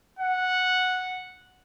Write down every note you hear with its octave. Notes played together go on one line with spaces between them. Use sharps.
F#5